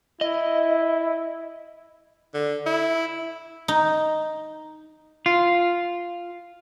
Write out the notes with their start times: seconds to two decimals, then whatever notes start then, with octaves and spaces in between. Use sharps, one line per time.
0.21 E4 D#5
2.34 D3
2.66 E4
3.68 D#4
5.26 F4